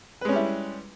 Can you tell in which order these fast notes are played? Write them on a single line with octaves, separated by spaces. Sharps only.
B4 G#3 C#4 G3 E4